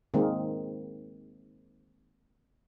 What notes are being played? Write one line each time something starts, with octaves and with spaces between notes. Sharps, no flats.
D#3 G#3 A#3 C4